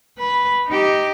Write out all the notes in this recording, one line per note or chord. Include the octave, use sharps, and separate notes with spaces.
B4
D#4 G4